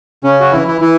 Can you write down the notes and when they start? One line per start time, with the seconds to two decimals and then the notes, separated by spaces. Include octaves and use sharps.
0.23 C#3 C#4
0.40 F#4
0.52 E3 E4
0.67 E3 E4
0.81 E3 E4